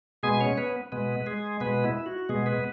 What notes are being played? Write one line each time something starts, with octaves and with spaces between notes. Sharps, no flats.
B2 G#3 B3 G#4 G#5
C#4 C#5
B3 B4
B2 G#3 B3 B4
G#3 G#4
B2 G#3 B3 B4
E4
F#4
B2 G#3 B3 G#4
B3 B4